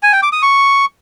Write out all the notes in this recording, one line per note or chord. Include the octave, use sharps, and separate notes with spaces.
G#5
G5
D6
D#6
C#6